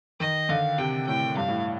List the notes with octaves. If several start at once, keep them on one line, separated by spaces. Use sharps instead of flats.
D#3 D#5
D3 F5
C3 G5
A2 G5
G2 F5
A2